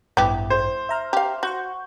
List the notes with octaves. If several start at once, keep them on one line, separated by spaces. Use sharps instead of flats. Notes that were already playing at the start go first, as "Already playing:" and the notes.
A1 G2 B3 E4 G4
C5
E5 A#5 F6
G4 F5
F#4 F#5 C#6 G6